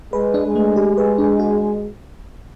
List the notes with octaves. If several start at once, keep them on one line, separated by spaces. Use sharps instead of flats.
G#3 B4
D4
G#3
A3
G4
B4
D4
F#4